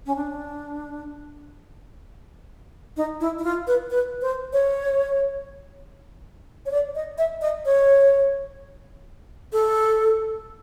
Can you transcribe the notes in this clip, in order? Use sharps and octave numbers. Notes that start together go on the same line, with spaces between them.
C#4
D4
D#4
E4
E4
F4
B4
B4
C5
C#5
C#5
D5
D#5
E5
D#5
C#5
A4